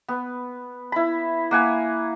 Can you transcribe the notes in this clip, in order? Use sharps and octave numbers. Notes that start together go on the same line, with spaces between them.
B3
E4 B5
A#3 F#5 G#5